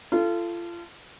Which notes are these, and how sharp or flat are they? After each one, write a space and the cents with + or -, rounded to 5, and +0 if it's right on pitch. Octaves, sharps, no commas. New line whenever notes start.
F4 -30 A4 +0